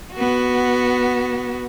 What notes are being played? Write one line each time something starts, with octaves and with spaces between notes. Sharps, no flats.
B3 F#4